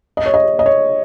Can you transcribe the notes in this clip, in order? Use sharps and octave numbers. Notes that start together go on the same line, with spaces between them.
D#5
C#5
D#5
D#5
C#5